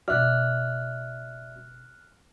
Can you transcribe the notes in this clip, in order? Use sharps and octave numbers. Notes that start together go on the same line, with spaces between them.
F#1 B2 F#4 D5 E5 F6 F#6